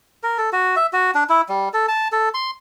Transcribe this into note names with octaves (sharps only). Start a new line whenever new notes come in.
A#4
A4
F#4
E5
F#4
D4
E4
G3
A4
A5
A4
C6